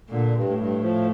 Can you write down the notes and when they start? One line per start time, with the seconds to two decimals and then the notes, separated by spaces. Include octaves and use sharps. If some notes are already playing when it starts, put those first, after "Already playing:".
0.09 A#2 D3
0.34 G2
0.47 A2
0.58 G2
0.82 F3